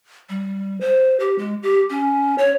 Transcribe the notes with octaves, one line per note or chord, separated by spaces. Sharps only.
G3
C5
G4
G#3
G4
C#4
C#5